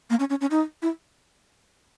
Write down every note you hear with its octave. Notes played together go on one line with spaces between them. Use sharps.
A#3
C#4
C#4
C#4
D#4
E4